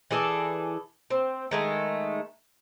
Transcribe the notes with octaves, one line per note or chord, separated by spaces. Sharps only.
E3 G#4 A4 D5
C4
D#3 G#3 A3